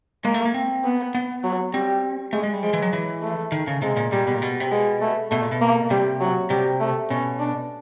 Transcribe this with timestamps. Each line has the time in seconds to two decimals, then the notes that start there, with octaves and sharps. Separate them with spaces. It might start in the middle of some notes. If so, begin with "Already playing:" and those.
0.25 G#3 A#3
0.34 A3
0.45 A#3
0.54 C4
0.85 B3
1.15 B3
1.44 F#3
1.74 G3 C4
2.33 G#3 A3
2.44 G#3
2.53 G3
2.63 F3 G#3
2.73 E3
2.82 F#3
2.93 E3
3.23 A3
3.52 D#3
3.67 C#3
3.82 C3 G#3
3.97 A#2
4.12 A#2 G3
4.28 B2
4.35 A#2
4.42 B2
4.60 C3
4.71 B2 G#3
5.01 A3
5.31 B2 A3
5.41 A#2
5.52 B2
5.61 A#3
5.90 C3 G3
6.21 F#3
6.50 C3 G3
6.80 A3
7.10 B2 C#4
7.40 D4